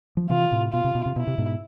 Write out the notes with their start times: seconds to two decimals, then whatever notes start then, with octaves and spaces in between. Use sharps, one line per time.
0.17 F3
0.30 C3 E3 F4
0.52 A2 C3
0.73 B2 F4
0.84 C3
0.95 B2
1.06 C3
1.16 B2 E4
1.27 C3
1.38 G#2 B2